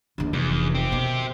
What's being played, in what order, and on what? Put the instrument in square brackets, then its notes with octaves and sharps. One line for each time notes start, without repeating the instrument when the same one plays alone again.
[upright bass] D#2 D3
[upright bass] F1 [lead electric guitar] E2
[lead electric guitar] C4 G4
[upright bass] B2 D#3